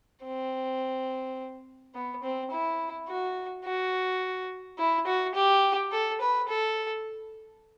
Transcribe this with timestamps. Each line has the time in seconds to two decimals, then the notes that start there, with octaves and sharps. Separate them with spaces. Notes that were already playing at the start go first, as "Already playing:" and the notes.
0.24 C4
1.94 B3
2.23 C4
2.51 E4
3.08 F#4
3.64 F#4
4.78 E4
5.07 F#4
5.35 G4
5.92 A4
6.21 B4
6.49 A4